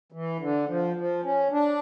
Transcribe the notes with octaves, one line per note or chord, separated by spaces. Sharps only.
E3
D3
F3
F3
C#4
D4